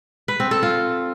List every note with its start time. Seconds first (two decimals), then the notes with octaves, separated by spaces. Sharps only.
0.28 B4
0.40 C4
0.51 A4
0.63 F4